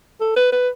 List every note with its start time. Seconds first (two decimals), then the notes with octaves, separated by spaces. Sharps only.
0.21 A4
0.36 B4
0.52 B4